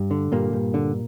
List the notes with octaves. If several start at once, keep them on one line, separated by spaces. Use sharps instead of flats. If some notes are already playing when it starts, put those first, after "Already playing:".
Already playing: G2
D3
G2 A#2 A#3
G2
D3